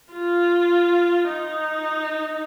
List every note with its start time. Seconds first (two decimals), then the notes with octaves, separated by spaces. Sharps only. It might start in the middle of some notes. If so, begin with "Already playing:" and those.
0.13 F4
1.31 D#4